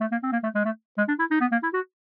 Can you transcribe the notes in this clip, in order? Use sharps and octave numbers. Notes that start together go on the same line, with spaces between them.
A3
A#3
C4
A#3
A3
G#3
A3
G#3
D4
E4
D#4
B3
A#3
E4
F#4